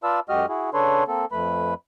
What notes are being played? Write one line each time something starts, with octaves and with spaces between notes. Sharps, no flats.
F4 B4 D5 F5 A5 E6
F#2 G#3 F#4 G4 D#5 F6
E4 F#4 G#4
C#3 D4 A4 B4 C#5 C6
A#3 C4 A4
F2 A3 B4 B5